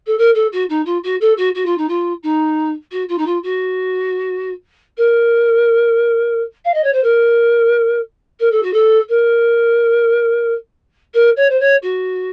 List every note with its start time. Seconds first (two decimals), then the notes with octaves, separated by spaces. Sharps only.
0.06 A4
0.18 A#4
0.34 A4
0.52 F#4
0.69 D#4
0.85 F4
1.03 F#4
1.20 A4
1.37 F#4
1.54 F#4
1.65 F4
1.77 D#4
1.88 F4
2.23 D#4
2.91 F#4
3.08 F4
3.18 D#4
3.26 F4
3.43 F#4
4.97 A#4
6.64 F5
6.73 D#5
6.83 C#5
6.92 C5
7.03 A#4
8.39 A#4
8.51 A4
8.62 F#4
8.73 A4
9.09 A#4
11.14 A#4
11.36 C#5
11.49 C5
11.59 C#5
11.82 F#4